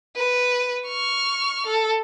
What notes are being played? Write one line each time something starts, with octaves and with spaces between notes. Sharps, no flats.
B4
C#6 F6
A4